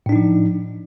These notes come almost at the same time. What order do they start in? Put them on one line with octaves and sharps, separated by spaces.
A2 D4 D#4 F3